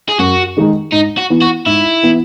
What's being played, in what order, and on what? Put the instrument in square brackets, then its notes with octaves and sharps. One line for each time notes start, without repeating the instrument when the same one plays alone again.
[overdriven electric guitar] G#4
[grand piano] F#2 [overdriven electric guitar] F#4
[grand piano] D#3 G#3 D#4
[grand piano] G#2 [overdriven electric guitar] D#4
[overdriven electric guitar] F#4
[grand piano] E3 B3
[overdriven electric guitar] F#4
[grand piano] G#2 [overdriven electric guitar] E4
[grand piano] E3 B3